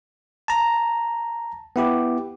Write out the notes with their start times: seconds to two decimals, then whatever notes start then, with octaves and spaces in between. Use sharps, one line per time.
0.48 A5 A#5
1.76 B3 E4 G4